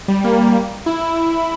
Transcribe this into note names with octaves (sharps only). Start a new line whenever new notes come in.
G3
A#3
E4